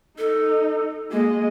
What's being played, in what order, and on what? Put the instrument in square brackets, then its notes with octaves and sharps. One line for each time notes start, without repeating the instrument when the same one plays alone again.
[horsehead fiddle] D#4 [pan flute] A4
[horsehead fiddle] G#3 D#5 [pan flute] A#3